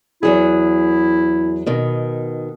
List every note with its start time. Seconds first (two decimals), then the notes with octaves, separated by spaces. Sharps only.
0.23 E2 F#3 E4 G#4
1.66 B2 D#3